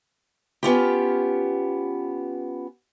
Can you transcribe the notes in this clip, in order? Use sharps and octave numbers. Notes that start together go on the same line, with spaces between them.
B3 C#4 F4 G4